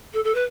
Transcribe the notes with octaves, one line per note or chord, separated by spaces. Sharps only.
A4
A4
B4